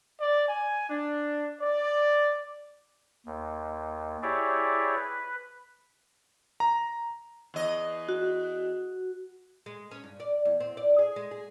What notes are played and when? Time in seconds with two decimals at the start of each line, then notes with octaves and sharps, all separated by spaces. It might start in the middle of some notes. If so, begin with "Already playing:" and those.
0.18 D5
0.48 G#5
0.89 D4
1.61 D5
3.26 D#2
4.23 E4 G4 G#4 C#5 D5 E5
4.96 B4
6.60 A#5
7.54 E2 D#5
8.09 F#4
9.66 G#3
9.91 C#4
10.04 G2
10.20 D5
10.45 E2
10.60 C4
10.77 D5
10.99 G#4
11.16 G#3
11.31 G#4